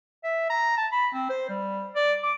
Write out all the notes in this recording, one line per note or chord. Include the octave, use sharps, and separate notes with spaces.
E5
A#5
A5
B5
C4
C5
G3
D5
D6